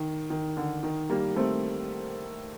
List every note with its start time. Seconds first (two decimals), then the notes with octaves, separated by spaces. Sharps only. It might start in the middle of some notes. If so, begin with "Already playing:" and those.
Already playing: D#3
0.30 D#3
0.57 D3
0.83 D#3
1.10 G3 A#3
1.36 A3 C4